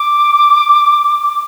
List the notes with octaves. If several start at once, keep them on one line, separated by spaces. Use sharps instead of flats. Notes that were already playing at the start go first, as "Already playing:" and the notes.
Already playing: D6